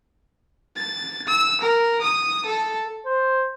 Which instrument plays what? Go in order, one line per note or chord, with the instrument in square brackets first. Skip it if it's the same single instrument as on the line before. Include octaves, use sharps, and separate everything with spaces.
[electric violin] A6
E6
A#4
D#6
A4
[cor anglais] C5